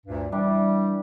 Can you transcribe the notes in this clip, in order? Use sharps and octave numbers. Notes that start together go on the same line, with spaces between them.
D2 G2 A#2
E3 G3 D4 G5